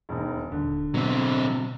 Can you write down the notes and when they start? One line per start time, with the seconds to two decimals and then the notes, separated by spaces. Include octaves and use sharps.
0.09 E1 D#2
0.52 D#1 D3
0.94 B2 F#3 C4